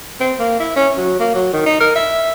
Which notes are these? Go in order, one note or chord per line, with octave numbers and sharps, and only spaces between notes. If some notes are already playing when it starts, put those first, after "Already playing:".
C4
A#3
E4
C#4
F#3
A#3
F#3
D#3
D#4
A#4
E5